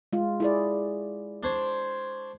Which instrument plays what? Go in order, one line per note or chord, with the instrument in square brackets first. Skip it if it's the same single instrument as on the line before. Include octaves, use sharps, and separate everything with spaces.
[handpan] G#3 F4
E4 G#4 D5
[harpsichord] D4 C5 C#5